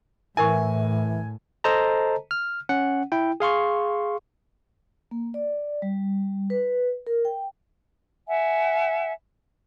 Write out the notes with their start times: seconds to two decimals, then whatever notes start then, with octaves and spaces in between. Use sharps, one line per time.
0.37 A2 E3 E4 A#4 G#5 C#6
1.64 A4 C5 D#5 A5 A#5
2.31 F6
2.69 C#4 F#5
3.12 E4 G5
3.40 G#4 F5 C6 C#6
5.11 A#3
5.34 D5
5.82 G3
6.50 B4
7.07 A#4
7.25 G5
8.28 E5 F#5 G#5